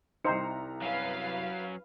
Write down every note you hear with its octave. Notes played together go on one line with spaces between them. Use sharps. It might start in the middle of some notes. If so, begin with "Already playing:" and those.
C2 D#4 C5 A#5 C#7
F#3 C#4 B4 F5